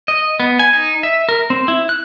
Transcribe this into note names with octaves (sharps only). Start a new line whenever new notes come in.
D#5
B3
G#5
D#4
E5
A#4
C4
E4
F#6